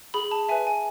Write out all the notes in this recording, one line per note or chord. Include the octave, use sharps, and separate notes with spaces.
G#4 B5
A5
B4 E5 G#5
G#5